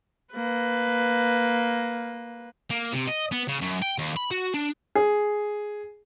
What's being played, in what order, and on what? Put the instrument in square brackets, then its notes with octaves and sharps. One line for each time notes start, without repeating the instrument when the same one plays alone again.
[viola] A#3 B4
[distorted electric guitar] A#3
C3
D#5
B3
C#3
F#2
G5
D#2
B5
F#4
D4
[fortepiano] G#4